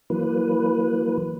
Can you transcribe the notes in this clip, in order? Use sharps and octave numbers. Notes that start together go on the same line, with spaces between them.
E3 F#3 A#3 B4